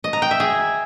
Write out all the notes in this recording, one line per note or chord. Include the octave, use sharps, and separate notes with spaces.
D#5
A#5
G5
E5
G#4